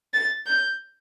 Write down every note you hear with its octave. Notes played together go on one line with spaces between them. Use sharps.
A6
G6